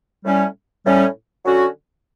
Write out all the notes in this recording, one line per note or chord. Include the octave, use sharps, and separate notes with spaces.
A2 G3 C#4
A2 G3 C#4
D3 F#3 C#4 F#4